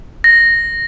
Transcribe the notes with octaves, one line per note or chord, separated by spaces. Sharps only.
A#6